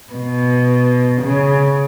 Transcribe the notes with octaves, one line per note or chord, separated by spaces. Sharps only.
B2
C#3